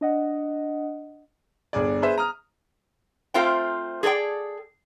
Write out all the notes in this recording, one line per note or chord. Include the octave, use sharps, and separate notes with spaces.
D4 D#5 F#5
G1 D4 G#4 D5
G#4 B4 C5 E5
A#5 D#6 F6
A3 C4 F4 C5 F5 G5
G#4 A4 C5 D5 G5